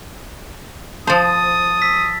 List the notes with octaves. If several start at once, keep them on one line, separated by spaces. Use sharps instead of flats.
F3 C5 A5 D#6 A6
E6 B6